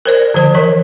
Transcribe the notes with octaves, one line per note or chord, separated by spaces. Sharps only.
A#4 C5 D5
D3 F3 C5
E3 A#4 D#5